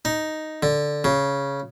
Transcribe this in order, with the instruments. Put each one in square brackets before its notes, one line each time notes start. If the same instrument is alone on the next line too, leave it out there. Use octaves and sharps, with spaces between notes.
[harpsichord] D#4
D3
C#3